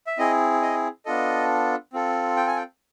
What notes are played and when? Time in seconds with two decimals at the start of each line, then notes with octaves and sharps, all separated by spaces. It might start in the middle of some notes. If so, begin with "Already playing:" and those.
0.07 E5
0.18 C4 E4 G#4 D#5
0.62 D#5
1.05 B3 D4 F4 A4 D#5
1.93 C4 F4 A4
2.37 G5
2.47 G#5
2.56 G5